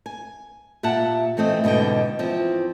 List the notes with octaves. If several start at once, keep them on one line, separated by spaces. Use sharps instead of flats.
G#5
A#2 G4 E5 F#5 A5
E3 A3 C4 D#5
G#2 B2 D3 D#5 G5
E2 F3 C4